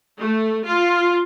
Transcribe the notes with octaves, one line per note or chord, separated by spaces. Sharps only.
A3
F4